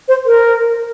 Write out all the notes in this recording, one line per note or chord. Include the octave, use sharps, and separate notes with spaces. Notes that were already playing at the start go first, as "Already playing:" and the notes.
C5
A#4